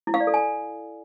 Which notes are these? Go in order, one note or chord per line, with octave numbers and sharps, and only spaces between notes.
E4
F5
D5
A4
G#5